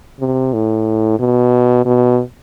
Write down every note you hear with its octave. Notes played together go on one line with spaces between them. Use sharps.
C3
A2
B2
B2